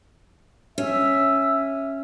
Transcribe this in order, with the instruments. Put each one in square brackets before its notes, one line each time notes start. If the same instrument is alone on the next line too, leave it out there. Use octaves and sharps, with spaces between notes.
[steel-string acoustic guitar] C#4 [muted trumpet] E5